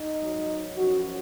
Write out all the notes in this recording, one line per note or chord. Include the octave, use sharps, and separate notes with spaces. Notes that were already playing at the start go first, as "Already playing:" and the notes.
Already playing: D#4
G#2 F#3
F#2 F3 F#4